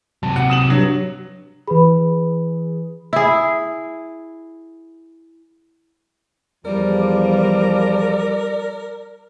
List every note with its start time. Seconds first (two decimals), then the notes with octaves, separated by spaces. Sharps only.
0.23 C3 F#3 A5
0.36 F#5
0.50 D#6 E7 F#7
0.70 G2 F#3
1.68 E3 G#4 B4 B5
3.13 E4 G#4
6.65 E2 F3 G3 A#4 D5